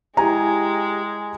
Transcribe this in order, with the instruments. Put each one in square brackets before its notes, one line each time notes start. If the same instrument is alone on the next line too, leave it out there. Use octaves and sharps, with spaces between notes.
[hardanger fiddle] G#3 [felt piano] E4 G#5 A#5 [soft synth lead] G4